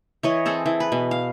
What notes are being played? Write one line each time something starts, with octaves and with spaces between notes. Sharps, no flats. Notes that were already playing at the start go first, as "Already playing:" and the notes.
E3 C#5 D#5
C4 G#4 A4
E3
B4
B2
F5